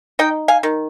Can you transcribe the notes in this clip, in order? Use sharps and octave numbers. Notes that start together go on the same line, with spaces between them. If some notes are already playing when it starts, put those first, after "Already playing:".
D#4 D#5 G5
F5 G#5
D#3